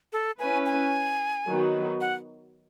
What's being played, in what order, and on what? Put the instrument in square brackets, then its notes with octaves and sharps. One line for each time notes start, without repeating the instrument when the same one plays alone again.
[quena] A4
[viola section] C#4 E4 B4 [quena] G#5
[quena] G#5
[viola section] D#3 F#3 B3 F#4
[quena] F#5